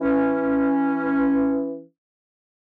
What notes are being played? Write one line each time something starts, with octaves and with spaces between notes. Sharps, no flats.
E3 C#4